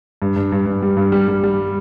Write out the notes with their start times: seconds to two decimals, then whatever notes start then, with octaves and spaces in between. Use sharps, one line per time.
0.22 G2
0.36 G2
0.52 G2
0.66 G2
0.82 G3
0.97 G2
1.12 G3
1.28 G3
1.43 G3